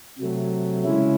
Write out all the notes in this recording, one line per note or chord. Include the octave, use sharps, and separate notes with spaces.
C3 F#3 A3
C#3 G#3 C#4 E4